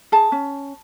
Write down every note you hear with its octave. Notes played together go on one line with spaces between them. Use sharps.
G#4 A5
C#4